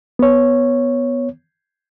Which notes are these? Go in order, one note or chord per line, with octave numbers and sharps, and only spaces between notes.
B3 C#5